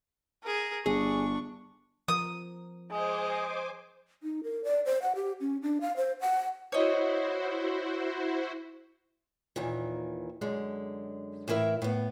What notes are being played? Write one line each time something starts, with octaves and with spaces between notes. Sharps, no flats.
G#4 A#4
G1 D4 G#4 C#6
F3 A#4 D#6
G#3 C5 D#5 G#5 D6
D#4
A#4
D5
C5
F#5
G4
C#4
D4
F5
C5
F#5
E4 F#4 C5 C#5 D#5
D#2 A#2 D#3 E3
F#2 D3 G#3
A2 E3 E4 A#4 E5
A2 B3